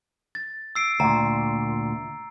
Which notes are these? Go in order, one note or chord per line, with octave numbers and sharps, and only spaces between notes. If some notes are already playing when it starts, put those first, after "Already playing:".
A6
E6 C7 D7
D2 A#2 A#5